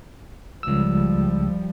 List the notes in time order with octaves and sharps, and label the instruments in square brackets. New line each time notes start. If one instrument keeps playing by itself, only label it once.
[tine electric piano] C#2 E6 [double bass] F3 G3